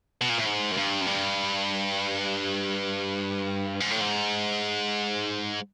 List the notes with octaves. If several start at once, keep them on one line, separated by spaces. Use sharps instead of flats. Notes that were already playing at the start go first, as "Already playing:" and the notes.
B2
A#2
A2
G#2
F#2
G2
F#2
G2
G#2
A2
G#2